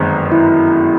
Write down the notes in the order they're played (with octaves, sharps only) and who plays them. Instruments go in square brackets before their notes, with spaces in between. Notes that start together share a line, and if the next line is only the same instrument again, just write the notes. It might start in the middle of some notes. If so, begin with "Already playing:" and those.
Already playing: [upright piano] G1 F#2 D#3 G#3 C4
[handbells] E4